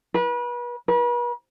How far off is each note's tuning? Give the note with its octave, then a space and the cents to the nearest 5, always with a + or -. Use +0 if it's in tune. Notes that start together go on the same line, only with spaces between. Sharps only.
B4 -35
B4 -40